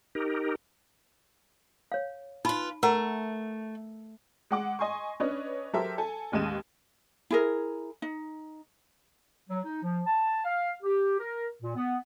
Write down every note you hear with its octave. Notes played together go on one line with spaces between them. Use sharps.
D#4 G4 A#4
C#5 F5
D#4 F4 B4 B5
A3 A#4 F#5 A#5
G#3 F#5 D6
D#5 G#5 C6 C#6
C#4 D4 B4 C#5 D#5
F#3 G4 A4 A#4 C5 E5
A4 G#5
A1 D#2 G#3 D#5 D#7 E7
E4 G#4 A#4
D#4
F#3
D#4
F3
A5
F5
G4
A#4
A#2
B3